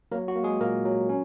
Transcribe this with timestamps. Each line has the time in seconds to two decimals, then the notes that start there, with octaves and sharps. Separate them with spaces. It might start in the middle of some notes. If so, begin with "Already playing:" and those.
0.12 F#3 A#3 A#4
0.28 F#4
0.36 A#3
0.43 G#3 G#4
0.60 A#2 A#3 A#4
0.85 F#3
1.09 C#4